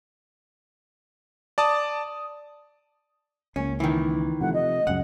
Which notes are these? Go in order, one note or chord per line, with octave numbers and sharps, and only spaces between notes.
D5 A5 D#6
C#2 G#3 A#3 C#4
D#3 E3
C3 F3 A3 F#5
D#5
C#2 F#2 C#3 F#5